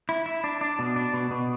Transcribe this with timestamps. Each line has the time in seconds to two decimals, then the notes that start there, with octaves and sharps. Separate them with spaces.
0.09 E4
0.26 E4
0.44 D4
0.61 D4
0.79 B2
0.96 D4
1.14 B2
1.31 B2